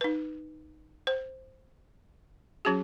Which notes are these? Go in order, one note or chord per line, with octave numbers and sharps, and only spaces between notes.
D#4 B4
C5
F#3 C#4 F#4 G#4